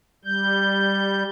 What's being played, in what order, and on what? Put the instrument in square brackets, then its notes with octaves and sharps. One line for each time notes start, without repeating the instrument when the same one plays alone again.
[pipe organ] G3 G6